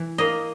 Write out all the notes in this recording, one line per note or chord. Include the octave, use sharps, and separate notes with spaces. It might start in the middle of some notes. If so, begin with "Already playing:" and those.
Already playing: E3
A#3 D#5